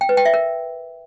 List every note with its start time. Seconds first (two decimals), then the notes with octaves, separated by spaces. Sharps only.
0.01 G5
0.09 B4
0.17 G5
0.25 E5
0.34 A#4